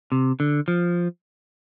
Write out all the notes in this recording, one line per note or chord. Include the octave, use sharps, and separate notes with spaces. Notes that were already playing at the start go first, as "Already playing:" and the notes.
C3
D3
F3